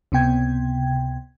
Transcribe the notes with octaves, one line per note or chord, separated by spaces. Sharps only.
C#2 C3 B3 G5 G#6